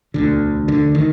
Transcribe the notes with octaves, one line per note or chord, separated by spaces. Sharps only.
E1 D2 D3
D3
D#3